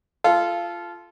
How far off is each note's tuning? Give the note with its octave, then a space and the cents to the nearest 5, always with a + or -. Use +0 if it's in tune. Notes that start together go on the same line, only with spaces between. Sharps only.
F4 -15 A4 -20